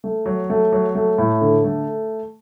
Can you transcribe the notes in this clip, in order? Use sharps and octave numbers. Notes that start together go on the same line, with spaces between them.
A3
F#3
A3
F#3
A3
A2
D3
A3